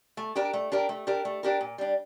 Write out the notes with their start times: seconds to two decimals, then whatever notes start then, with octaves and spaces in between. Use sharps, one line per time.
0.17 A3
0.35 D4 G4 A#4
0.53 A3
0.72 D4 G4 A#4
0.89 A3
1.07 D4 G4 A#4
1.25 A3
1.43 D4 G4 A#4
1.61 A#2
1.78 G3 D4